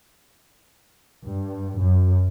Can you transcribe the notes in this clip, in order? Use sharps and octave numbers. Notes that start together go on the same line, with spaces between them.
G2
F#2